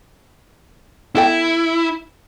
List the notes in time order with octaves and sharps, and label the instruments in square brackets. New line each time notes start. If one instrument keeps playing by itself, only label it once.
[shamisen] B3 A4 G5 [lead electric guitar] E4